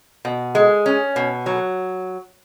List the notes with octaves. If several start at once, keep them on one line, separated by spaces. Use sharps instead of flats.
B2
G#3
C#4
B2
F#3